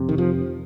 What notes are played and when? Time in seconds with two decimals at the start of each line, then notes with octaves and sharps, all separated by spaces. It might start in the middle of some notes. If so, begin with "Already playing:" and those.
Already playing: F2 C3
0.09 D#3
0.18 F3